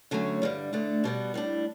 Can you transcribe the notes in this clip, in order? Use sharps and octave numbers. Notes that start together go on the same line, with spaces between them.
D3 F#3 A3 C#4
G2 D3 G3
D2 D3 A3 D4
B2 G3 B3
A2 G3 D4